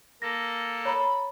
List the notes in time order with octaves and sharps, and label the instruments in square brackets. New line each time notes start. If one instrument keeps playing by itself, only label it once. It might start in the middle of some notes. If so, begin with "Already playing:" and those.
[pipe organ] A#3 A4 [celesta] A#6
[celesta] C#5 A#5 [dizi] B5